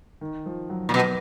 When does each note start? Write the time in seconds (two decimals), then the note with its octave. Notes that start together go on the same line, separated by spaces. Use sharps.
0.21 D#3
0.46 F3
0.70 F#3
0.89 A#2
0.94 B2 F#3